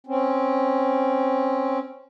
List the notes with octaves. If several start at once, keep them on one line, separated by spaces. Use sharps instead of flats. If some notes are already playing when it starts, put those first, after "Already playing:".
C4 C#4